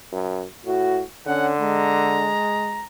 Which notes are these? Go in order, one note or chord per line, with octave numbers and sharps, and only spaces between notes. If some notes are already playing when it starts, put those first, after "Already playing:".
F#2
A2 F#4
D3 C#4 F#5
G#3 A#5